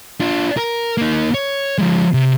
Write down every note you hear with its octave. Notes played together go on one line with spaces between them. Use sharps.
D4 F4
A#4
A#3 D#4
C#5
F3 G#3
C3